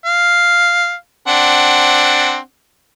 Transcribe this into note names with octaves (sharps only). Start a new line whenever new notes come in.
F5
C4 D4 F#5